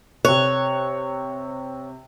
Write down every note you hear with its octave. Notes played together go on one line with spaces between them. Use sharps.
C3 C#5 F#6